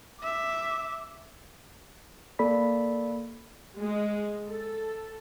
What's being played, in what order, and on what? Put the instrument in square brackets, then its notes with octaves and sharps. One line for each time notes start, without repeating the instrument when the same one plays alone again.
[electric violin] E5 D6
[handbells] A#3 A4 D5 B5 B6
[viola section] G#3
A4